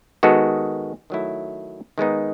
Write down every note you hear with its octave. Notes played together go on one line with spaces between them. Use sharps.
D#3 G#3 B3 F#4 A4
D#3 F#3 A3 E4
D#3 G#3 B3 D#4